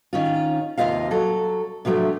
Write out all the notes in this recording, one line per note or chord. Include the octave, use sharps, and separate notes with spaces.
D#3 C#4 F4
D#2 C3 A#3 F4 D#5 F5
F#3 A4
C3 F3 F#3 A3 D4